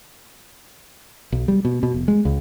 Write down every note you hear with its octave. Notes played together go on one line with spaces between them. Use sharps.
B1
G3
B2
B2
F1
G#3
C#2